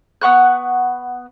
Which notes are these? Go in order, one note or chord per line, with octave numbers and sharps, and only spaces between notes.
B3 F#5 C#6 F#6